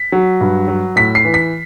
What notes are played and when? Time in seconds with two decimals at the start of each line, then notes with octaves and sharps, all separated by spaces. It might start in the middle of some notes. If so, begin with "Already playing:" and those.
Already playing: B6
0.12 F#3
0.41 G2
0.68 F#3
0.96 A2 B6
1.15 C7
1.24 E3
1.34 B6